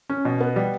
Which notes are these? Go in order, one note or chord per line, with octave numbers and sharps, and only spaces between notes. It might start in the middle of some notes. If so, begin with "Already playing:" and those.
C#4
B2
B3
G3